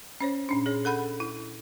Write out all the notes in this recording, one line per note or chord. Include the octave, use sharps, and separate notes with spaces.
C#4 C5 C#5
A#2 C#4 D4
G#4 C#5
A4 F#5 B5 G6
E4